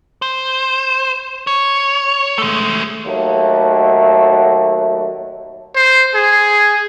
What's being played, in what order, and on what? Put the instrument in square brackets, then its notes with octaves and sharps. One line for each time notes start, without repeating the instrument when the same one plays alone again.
[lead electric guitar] C5
C#5
G#3 A3
[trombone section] D#2 F#3 A3
[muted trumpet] C5
G#4